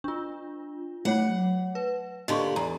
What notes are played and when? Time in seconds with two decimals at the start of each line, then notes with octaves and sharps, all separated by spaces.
0.04 D4 F4
1.05 F#3 A3 C#5 F#5
1.75 B4
2.28 A#2 D3 G4 D#5 C6 C#6
2.56 E2 A#5